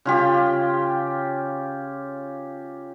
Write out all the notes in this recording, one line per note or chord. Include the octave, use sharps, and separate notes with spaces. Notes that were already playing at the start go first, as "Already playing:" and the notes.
C#3 F4 G4